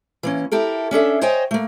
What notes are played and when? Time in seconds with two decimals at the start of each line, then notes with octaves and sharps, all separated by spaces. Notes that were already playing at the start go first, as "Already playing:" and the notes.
0.23 E3 A#3 C#4
0.52 E4 G4 A4 A#4
0.91 C#4 D4 A4 E5
1.21 C5 C#5 D#5 G5 G#5
1.51 A3 A#3